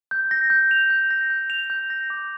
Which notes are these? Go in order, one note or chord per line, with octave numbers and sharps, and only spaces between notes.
G6
A#6
G6
F7
G6
A#6
G6
F7
G6
A#6
D6